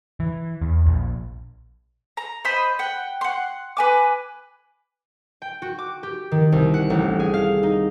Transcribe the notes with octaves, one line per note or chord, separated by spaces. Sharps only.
E3
E2
A#1
A#5
C5 D#5 B5
F#5 G5
F#5 C6
B4 G#5 D6
G5
F#4
D6
G4
D#3
C2
F#5
A1
G#4
F5
D#4